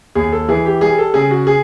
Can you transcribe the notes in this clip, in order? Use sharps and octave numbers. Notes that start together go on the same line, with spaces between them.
D#2 G#4
A4
E3 G#4
G4
G3 G#4
A4
C#3 G#4
F#4
G#4